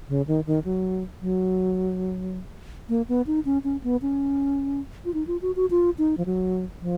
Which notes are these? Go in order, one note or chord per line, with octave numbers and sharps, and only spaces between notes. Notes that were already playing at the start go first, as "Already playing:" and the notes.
C#3
D#3
D#3
F#3
F#3
A#3
B3
D#4
C#4
C#4
B3
C#4
F4
D#4
F4
F#4
F#4
F4
D#4
F3
F#3
F3